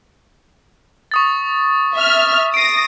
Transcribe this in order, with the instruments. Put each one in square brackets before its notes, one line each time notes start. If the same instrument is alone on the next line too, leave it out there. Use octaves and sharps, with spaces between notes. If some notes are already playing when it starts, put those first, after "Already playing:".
[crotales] C#6 D#6 A6
[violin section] E5 F6
[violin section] D#6 A#6 [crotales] C7 D7